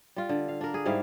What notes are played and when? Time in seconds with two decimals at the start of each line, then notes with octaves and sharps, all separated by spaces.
0.16 G3 F4
0.29 D3
0.48 F5
0.61 D4 A#4
0.74 G#4
0.85 G#2 G3 E4 F5